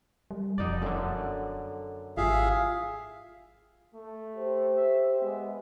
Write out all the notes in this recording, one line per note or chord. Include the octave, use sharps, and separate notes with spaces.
G3
E1 F2 B2 D#4 D5
F#2 D3 A4
G#1 F4 G4 G#4 E5 F5
A3
G4 C5
E5
G#3 B3 E5